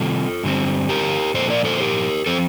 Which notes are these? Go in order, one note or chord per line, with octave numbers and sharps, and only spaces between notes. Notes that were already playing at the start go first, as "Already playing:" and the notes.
Already playing: C3 D#3 G3 C4 F4 A4
G2 D3 G3 C4
G4 A#4
A#2 F3 A#3 A4 C5
A#4 D5
A4 C5
G4 A#4
F3 C4 A4 C5